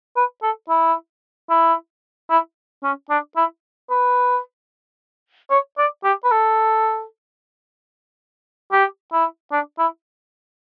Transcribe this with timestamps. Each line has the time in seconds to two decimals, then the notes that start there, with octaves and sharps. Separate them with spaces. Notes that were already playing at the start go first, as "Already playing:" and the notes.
0.16 B4
0.43 A4
0.69 E4
1.50 E4
2.30 E4
2.84 C#4
3.10 D4
3.37 E4
3.90 B4
5.51 C#5
5.78 D5
6.04 G4
6.24 B4
6.32 A4
8.72 G4
9.13 E4
9.52 D4
9.79 E4